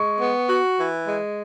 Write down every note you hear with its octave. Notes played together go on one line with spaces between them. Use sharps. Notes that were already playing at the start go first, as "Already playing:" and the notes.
Already playing: G#3 C#6
B3
F#4
E3
G#3